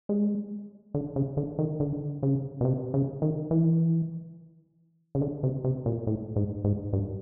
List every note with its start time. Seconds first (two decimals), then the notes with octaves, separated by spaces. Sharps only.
0.09 G#3
0.94 D3
1.16 C#3
1.37 D3
1.59 D#3
1.80 D3
2.23 C#3
2.61 B2
2.65 C3
2.94 C#3
3.22 D#3
3.51 E3
5.15 C#3
5.21 D3
5.43 C3
5.65 C3
5.86 A#2
6.07 A2
6.36 G#2
6.64 G#2
6.93 G2